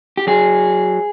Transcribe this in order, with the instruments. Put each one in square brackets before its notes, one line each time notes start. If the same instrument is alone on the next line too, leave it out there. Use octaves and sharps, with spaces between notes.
[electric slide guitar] G4
F#3 G#4